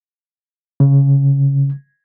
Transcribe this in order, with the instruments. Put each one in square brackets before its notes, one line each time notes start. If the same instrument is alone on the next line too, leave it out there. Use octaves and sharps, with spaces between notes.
[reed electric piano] C#3